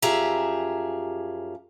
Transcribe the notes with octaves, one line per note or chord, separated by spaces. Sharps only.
F#2 F3 G4 G#4 E5 A#5